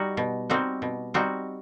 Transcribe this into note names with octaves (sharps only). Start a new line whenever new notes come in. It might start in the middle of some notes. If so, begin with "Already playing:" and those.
Already playing: G3 D#4 F#4
B2
G3 C4 D#4 F#4
B2
G3 C4 D#4 F#4